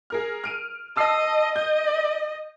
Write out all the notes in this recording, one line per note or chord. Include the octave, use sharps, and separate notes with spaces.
G#4 A#4 F6
F6 D7 D#7
D#5 A5 E6 C7
D#5 G6